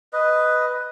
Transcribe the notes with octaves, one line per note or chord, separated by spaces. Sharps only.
B4 D#5